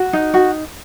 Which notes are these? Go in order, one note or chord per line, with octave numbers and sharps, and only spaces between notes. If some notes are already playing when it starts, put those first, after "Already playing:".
Already playing: F#4
D#4
F#4